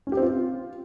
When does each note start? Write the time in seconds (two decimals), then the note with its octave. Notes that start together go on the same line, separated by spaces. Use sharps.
0.07 C#4
0.12 G4
0.17 C4
0.22 F4